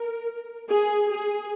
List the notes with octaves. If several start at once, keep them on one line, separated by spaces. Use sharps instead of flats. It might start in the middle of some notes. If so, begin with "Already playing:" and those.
Already playing: A#4
G#4
G#4